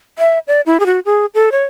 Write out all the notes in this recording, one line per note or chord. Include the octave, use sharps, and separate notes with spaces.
E5
D5
E4
G#4
F#4
G#4
A4
C#5